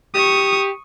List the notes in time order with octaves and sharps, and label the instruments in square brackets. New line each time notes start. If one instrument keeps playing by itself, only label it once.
[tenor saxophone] G4 [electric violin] C#6 D#6